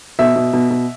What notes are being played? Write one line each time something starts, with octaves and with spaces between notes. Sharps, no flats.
B2 E5
B2
B2
B2